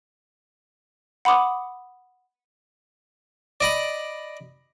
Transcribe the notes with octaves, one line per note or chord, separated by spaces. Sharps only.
F#5 B5 C6 D6 D#6
D5 D#5 B5